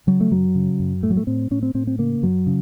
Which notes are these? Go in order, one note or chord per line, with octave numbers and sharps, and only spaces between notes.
C#3 F#3
A3
F#2 F#3
C#3
F#2
A2 A3
F#3
A3
A2 C4
A2 C#4
C4
A2 C4
C4
C#3 A#3
F#2 F#3
C#3